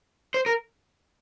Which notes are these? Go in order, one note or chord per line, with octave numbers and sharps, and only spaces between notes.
C5
A#4